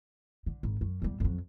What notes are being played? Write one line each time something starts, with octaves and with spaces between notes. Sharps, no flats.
D3
G#1
F#2
E2 G3
F2 F#3